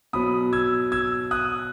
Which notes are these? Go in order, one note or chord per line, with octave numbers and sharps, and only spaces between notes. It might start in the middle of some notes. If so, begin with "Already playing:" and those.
B2 F#3 B5 D#6
E6 G#6
E6 G#6
D#6 F#6